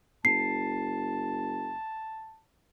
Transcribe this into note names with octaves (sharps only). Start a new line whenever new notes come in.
F#1 A5 C7